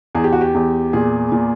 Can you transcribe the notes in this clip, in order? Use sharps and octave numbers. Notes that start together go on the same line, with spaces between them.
E2 G#4
G4
F#4
G4
E2
A#2 G#4
A#2